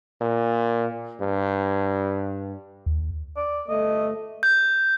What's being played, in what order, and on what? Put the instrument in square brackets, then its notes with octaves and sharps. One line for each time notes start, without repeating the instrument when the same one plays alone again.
[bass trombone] A#2
G2
[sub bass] D#2
[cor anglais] D5
[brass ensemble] G1 A3 [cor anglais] D#5
[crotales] G6